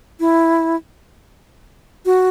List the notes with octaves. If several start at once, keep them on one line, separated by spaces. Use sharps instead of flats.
E4
F#4